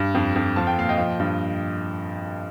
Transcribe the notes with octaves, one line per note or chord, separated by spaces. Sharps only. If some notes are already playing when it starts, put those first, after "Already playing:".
Already playing: G2
F2
F2
F3 A5
G5
A#2 F5
D#5 G5
F3
G2